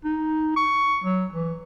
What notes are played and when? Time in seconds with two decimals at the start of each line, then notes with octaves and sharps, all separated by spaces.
0.05 D#4
0.56 C#6
1.04 F#3
1.33 E3